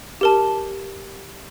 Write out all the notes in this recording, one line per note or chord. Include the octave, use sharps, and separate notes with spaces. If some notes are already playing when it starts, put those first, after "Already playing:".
G4 A#4 A5